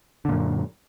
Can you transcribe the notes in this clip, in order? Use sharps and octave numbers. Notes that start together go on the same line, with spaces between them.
F#2 A#2 D3